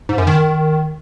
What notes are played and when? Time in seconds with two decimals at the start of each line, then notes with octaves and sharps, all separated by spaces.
0.09 G#2
0.18 F#2
0.27 D#3